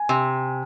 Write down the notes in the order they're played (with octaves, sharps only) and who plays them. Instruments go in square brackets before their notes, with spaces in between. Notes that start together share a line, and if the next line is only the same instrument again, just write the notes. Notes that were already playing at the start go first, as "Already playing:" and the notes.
Already playing: [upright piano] G#5
[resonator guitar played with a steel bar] C3